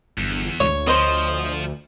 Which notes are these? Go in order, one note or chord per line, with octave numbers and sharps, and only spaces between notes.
G1 E2
D2 C#5
F3 C5 D#5